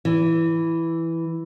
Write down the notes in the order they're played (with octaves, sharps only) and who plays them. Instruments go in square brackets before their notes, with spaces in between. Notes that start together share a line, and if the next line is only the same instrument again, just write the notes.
[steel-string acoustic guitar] E3